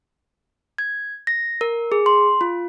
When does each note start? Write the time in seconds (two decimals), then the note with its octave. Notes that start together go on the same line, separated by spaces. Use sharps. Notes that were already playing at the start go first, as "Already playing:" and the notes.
0.78 G#6
1.27 A#6
1.61 A#4
1.92 G#4
2.06 C6
2.41 F4